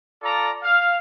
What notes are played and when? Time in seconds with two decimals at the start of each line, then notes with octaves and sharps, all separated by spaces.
0.23 F4 A4 D5 A#5
0.64 F5